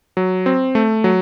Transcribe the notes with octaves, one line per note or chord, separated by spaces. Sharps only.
F#3
C4
A3
F#3